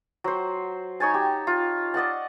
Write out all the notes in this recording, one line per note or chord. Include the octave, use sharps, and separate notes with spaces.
F#3 C5
D#4 C#5 G#5 A5
G4
F4
D5 D#5 F#5 A5